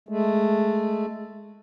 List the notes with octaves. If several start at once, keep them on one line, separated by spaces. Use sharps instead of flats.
G#3 A3